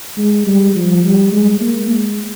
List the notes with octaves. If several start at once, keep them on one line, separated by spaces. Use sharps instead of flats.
G#3
G3
F3
G3
G#3
A#3
G#3